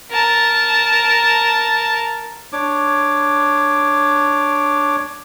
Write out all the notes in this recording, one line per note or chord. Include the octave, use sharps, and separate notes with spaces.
A#4 A5
D4 C#5 D6